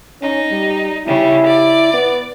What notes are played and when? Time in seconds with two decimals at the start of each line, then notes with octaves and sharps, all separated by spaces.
0.22 C#4 D#4
0.51 G3
1.06 C#3 G3 E4
1.46 D5
1.94 B3